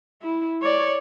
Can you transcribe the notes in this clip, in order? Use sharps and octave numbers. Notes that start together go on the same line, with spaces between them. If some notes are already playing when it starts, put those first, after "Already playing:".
E4
C#5 D5